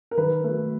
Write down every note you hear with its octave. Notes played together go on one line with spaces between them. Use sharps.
A#4
D#3 B4
F#3 A3